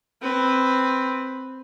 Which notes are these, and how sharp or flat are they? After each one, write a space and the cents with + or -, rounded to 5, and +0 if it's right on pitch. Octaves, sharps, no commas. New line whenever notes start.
C4 +0 B4 +5